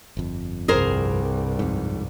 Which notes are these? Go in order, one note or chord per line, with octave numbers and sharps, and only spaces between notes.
G1 F2
C2 G2 G#4 A#4 C5
F2 G#2